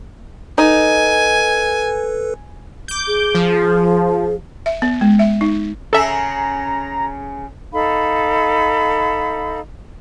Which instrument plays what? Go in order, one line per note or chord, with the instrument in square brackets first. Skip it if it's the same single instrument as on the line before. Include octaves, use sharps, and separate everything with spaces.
[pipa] D#4 [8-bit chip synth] A4 B4 [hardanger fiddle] G#5
[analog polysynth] D6 G6
[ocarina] G#4
[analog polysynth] F3
[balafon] E5
B3
G#3
E5
D#4
[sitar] C#3 C#4 G#4 [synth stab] A4 E5 [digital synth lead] A#5
[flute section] D#4 A4 F5 B5